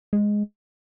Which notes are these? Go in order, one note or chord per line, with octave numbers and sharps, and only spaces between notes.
G#3